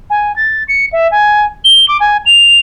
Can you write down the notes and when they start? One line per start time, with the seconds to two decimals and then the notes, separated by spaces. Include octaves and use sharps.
0.10 G#5
0.36 A6
0.68 C#7
0.93 E5
1.11 G#5
1.65 G7
1.88 D6
2.00 G#5
2.26 F7